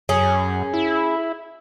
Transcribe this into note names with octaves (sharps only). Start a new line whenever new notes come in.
F#2 C#4 G#4
E4